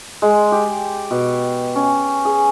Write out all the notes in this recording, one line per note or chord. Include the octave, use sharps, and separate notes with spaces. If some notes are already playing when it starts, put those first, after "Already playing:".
G#3
G4
B2
C#4
G#4